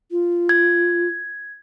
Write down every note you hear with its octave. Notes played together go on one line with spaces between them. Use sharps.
F4
G#6